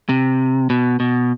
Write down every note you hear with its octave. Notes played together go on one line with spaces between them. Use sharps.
C3
B2
B2